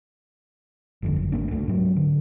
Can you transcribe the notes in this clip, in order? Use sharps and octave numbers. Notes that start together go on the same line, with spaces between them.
G1 F2 D3
F#1
G#1 A#3 D4
C#2 A3 D4
G#2 F#3
D3